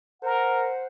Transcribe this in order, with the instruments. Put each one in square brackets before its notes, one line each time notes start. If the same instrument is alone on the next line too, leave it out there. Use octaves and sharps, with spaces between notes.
[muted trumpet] A#4 [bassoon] C5 [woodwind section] F#5